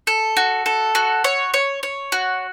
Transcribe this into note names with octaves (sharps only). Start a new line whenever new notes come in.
A4
F#4
A4
F#4
C#5
C#5
C#5
F#4